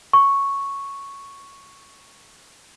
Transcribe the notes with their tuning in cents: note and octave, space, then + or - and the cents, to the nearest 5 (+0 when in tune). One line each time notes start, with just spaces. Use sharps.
C#6 +0